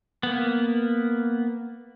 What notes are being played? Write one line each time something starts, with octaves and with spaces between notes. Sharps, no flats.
A#3 B3